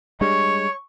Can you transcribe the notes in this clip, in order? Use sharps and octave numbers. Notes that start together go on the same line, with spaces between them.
G3 G#3 D4 C#5 C#6